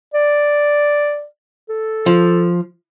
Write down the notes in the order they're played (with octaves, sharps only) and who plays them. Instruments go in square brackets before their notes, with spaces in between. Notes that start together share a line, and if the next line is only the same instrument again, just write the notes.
[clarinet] D5
A4
[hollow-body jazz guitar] F3